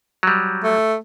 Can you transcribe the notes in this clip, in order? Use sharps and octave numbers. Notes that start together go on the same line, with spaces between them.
F#3 G3
A3